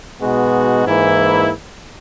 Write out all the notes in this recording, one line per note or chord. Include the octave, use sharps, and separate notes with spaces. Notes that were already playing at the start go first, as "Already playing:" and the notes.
B2 G#3 B3 D#4 F#4
G#2 E3 A#3 E4